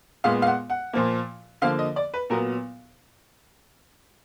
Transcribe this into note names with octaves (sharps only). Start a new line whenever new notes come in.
A#2 G#3 B3 F5
F5
F#5
F#5
A#2 F3 A#3
D3 F3 A#3 F5
D#5
D5
B4
A#2 F#3 B3 A#4